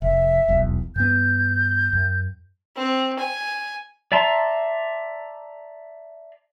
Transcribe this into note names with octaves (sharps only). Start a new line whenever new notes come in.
F1 E5
D#1 B1 E2
G2 B3 G6
F#2
C4
G#5
D5 E5 A5 A#5 C6